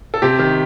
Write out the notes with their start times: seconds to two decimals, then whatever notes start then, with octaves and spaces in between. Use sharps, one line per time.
0.14 A4
0.22 C3 G4
0.39 D#3